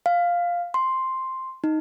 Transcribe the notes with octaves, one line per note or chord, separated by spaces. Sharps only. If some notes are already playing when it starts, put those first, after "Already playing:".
F5
C6
D#4